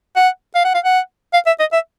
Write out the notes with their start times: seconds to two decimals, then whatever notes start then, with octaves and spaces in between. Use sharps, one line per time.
0.16 F#5
0.55 F5
0.65 F#5
0.74 F5
0.84 F#5
1.33 F5
1.46 E5
1.60 D#5
1.73 E5